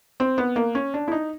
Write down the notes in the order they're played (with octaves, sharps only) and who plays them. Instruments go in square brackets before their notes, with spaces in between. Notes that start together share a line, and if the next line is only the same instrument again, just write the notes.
[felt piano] C4
B3
A#3
C#4
D4
E4
D#4